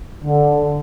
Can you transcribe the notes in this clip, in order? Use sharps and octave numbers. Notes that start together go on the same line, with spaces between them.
D3